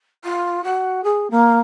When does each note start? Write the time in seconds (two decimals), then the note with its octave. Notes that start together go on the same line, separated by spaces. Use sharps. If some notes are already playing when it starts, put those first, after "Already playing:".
0.24 F4
0.64 F#4
1.04 G#4
1.31 A#3